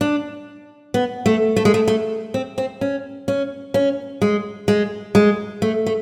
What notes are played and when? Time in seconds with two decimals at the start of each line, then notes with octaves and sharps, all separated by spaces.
0.01 D4
0.94 B3
1.26 A3
1.56 A3
1.65 G#3
1.74 A3
1.88 A3
2.34 C4
2.58 C4
2.81 C#4
3.28 C#4
3.74 C#4
4.22 G#3
4.68 G#3
5.15 G#3
5.62 A3
5.86 A3